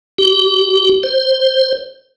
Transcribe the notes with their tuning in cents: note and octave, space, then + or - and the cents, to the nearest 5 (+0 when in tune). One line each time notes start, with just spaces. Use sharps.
G4 -35
C5 +5